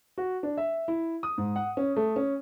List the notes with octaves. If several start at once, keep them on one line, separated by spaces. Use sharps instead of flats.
F#4
D4
E5
E4
D#6
G#2
F#5
C#4
A3
C#4